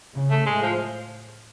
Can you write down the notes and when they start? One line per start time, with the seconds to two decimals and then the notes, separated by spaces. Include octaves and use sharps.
0.15 C#3
0.31 A3
0.46 A2 G#3
0.62 F3